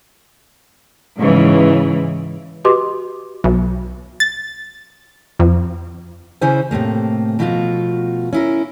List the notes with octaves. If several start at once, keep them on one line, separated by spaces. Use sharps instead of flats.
G#2 C#3 E3
F#4 G4 B4 D#5 C6 D6
B1
A6
F2
C#3 C#4 E4 C5 G#5
A2 C3 A3 A#3
B2 F3 A3 F4 F#4
C#4 E4 A#4